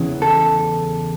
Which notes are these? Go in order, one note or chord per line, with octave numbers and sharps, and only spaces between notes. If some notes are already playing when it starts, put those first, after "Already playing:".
Already playing: E2 C#3 E3
A4